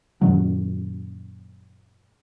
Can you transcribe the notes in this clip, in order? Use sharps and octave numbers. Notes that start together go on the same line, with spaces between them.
F#2 A#2 D#3 F#3